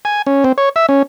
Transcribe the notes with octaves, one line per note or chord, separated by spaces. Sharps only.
G#5
C#4
C4
C#5
E5
C#4